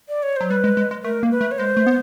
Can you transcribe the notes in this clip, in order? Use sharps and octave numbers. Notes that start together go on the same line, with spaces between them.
D5
C#5
F#3 C5
G3 B4
G#3
G#3
G#3
A3 A#4
A#3
B4
A3
C#5
G#3 C5
A3
B3